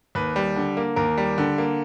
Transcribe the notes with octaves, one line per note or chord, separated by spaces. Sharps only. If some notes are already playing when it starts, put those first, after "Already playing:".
D#2 B4
G3
D3
A#3
D#2 A#4
G3
D3
A#3